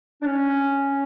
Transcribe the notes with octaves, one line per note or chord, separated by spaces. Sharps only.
D4
C#4